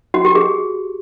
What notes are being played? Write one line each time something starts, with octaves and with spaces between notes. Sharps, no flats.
F#4
G4
G#4